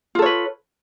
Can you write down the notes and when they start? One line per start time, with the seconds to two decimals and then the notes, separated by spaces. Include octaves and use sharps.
0.15 F4
0.19 A4
0.22 C#5
0.26 B4